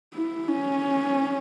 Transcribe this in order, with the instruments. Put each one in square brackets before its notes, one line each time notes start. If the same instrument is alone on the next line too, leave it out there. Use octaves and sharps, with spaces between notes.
[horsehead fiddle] E4
C#4